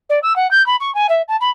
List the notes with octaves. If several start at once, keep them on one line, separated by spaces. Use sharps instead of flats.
D5
E6
F#5
G6
B5
C#6
G#5
E5
A5
B5